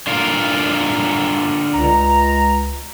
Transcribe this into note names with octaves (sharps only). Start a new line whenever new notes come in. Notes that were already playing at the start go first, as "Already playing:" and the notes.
D3 F4 A#4
C#2 A#5